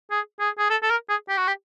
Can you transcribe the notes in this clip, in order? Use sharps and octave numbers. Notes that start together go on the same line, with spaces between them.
G#4
G#4
G#4
A4
A4
A#4
G#4
G4
F#4
G4